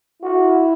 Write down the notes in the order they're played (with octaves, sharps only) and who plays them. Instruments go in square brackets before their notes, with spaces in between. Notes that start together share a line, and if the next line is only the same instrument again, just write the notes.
[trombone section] E4 [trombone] F#4